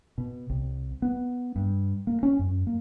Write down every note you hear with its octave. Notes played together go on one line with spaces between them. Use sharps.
B2
C2
B3
G2
A#3
C#4
F#2
A#3